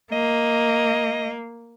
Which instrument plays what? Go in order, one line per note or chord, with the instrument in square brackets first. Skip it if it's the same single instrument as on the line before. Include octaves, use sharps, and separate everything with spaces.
[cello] A#3 [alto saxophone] D#5